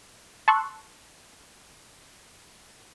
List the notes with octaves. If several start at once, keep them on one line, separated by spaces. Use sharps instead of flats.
A5 C6 C#6 E6 F#6